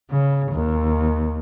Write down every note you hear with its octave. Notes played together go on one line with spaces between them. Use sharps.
C#3
D#2